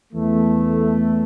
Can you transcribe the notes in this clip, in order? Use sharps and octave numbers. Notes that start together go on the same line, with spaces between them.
E2 E3 A3